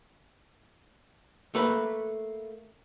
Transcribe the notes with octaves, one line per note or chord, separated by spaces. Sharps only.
A3 A#3 B4